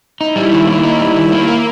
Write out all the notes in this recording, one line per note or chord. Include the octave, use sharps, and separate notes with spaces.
D#4 E4
G3
D#3
A#3
D#4
G3
D#3
A#3
A#4